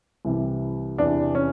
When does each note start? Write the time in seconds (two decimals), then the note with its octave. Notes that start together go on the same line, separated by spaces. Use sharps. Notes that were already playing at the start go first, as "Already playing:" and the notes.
0.25 C2 C3 E3
0.98 E2 C3 E3 D4
1.35 C#4